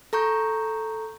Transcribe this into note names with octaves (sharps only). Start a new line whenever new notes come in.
A4 A#5 C#6 G6